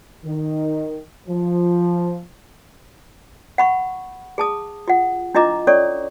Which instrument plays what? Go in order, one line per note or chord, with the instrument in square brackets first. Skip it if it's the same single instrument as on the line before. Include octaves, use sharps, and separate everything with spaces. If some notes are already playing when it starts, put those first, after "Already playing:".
[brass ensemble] D#3
F3
[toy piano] F#5 B5 C#6
G#4 A5 D#6
F4 F#5
D4 E4 F4 D#5 A#5 D6
C#4 A4 C#5 D5 C#6